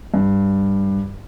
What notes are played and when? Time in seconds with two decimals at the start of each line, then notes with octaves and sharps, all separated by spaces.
0.14 G2